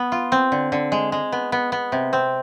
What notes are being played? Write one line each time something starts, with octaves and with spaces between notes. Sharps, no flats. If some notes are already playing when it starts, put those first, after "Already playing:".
Already playing: B3
F4
C4
D3
D3
G#3
G#3
B3
B3
B3
C3
C4